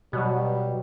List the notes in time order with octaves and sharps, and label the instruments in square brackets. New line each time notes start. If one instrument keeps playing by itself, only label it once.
[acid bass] B2 [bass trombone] F#3 [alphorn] G3